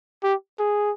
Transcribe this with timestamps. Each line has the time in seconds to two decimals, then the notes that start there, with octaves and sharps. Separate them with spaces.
0.23 G4
0.59 G#4